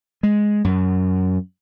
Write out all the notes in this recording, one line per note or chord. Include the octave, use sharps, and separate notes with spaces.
G#3
F#2